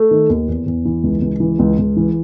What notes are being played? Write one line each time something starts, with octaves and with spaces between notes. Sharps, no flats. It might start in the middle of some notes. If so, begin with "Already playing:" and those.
Already playing: A3
D#3
D#2
E2
E2
E3
C#2
C#2
E3
C#2
C#2
E3